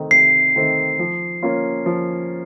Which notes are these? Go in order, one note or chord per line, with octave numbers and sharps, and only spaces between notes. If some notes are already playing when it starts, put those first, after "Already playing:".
Already playing: C3 D#3 A3 C4 D#4
C3 C7
D#3 A3 C4 D#4
F3
A#3 C#4 F4
F3